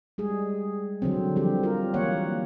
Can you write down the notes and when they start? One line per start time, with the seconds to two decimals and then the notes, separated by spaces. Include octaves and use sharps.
0.18 G3 G#3 G#4
1.02 D3 F#3 C4
1.36 F3 G3 C4 G4
1.63 F4 A#4
1.94 E3 F#3 A#3 C#5 F#5